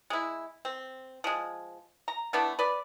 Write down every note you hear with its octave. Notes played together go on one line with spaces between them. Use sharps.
G#3 E4
C4
F3 G#3
A#5
A3 B3 D4 E4
B4 D5